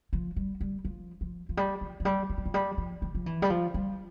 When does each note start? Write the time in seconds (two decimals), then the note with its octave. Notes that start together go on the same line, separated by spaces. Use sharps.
0.13 F3
0.36 G3
0.61 G3
0.85 F3
1.21 F3
1.49 F3
1.57 G3
1.81 F3
2.00 F3
2.05 G3
2.30 F3
2.38 G3
2.46 F3
2.54 G3
2.78 F3
3.02 E3
3.15 F3
3.26 E3
3.42 G3
3.50 F3
3.74 G3